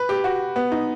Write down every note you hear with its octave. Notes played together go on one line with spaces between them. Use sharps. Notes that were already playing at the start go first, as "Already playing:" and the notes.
Already playing: B4
G4
F#4
B3
D#4